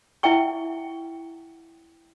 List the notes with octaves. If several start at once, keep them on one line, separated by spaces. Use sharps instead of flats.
E4 E5 F#5 G5 C#6